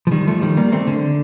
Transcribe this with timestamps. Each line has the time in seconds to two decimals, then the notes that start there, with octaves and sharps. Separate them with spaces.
0.07 F3
0.12 D#3 G3
0.27 F3 A3
0.41 D#3 G3
0.57 G3 A#3
0.72 A3 C4
0.87 D3